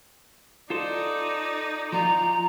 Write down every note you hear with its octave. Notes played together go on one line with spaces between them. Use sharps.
D#4 F4 A4 C5 D5
F3 F4 A#5